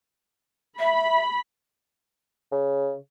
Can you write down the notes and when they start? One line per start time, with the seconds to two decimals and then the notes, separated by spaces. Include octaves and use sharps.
0.79 E5 B5
2.52 C#3